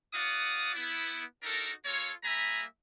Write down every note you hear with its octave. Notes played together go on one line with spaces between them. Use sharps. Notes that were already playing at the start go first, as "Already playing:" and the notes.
E4 F#4 D5 F5 F#5 D#6
B3 E4
D4 D#4 F#4 A4 A#4
A#3 F4 A4 C#5
G3 A#3 E5 G#5 A#5 B5